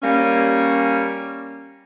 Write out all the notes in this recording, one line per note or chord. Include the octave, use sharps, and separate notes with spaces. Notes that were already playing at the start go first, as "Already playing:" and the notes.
G3 A#3 C#4